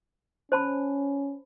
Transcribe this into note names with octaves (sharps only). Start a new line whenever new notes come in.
C#4 C5 A5 B5